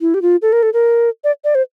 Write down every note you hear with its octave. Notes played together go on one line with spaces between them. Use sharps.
E4
G4
F4
A4
A#4
A4
A#4
D5
D5
C5